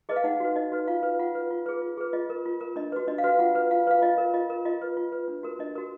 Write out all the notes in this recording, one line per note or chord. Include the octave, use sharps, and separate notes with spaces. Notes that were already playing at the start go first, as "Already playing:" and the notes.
G#4 B4 D#5
F5
D#4 F#5
F#4 B4
D#4 D#5
F#4 B4
F4 F5
B4
F4 F#5
B4
F4
G#4 B4
F4
G#4 B4
F4 D#5
A#4
F4
A#4
D4 D#5
F#4 B4
D4 D#5
F5
F#4 B4
F5
F4 F#5
B4
F4 F5
B4 F5
F4 D#5
A#4
F4 D#5
A#4
F4 D#5
B4
F4
B4
D4
F#4 A#4
D4 D#5
F#4 A#4